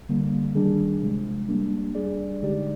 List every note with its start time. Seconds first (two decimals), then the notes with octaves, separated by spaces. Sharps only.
0.09 D3 G3 A#3
0.55 D#3 G3 D4 G#4
1.02 C3 F3 G#3
1.48 G3 A#3 D4
1.95 G3 D4 G#4 D5
2.42 D3 G#3 D#4 G4 D5